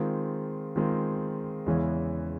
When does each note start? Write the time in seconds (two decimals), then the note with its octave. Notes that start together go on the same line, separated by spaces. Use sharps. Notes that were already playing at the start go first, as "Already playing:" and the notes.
Already playing: D#3 G#3 C4 F4
0.76 D#3 G#3 C4 F4
1.66 E2 C#3 E3 G#3 C#4